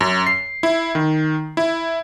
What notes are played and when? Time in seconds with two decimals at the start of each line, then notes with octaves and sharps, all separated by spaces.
0.01 F#2
0.27 C7
0.63 E4
0.95 D#3
1.57 E4